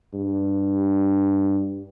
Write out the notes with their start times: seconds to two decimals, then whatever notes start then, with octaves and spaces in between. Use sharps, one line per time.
0.14 G2